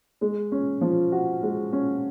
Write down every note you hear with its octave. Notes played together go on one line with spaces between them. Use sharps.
G#3
C#4
F3
F#4
G#3
C#4